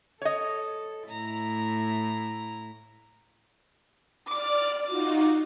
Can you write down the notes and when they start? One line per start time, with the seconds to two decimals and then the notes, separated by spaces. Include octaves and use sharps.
0.22 A4 C#5 D#5
1.09 A2 E4 A#5
4.28 D5 D6 F6
4.86 D#4 F4 F#4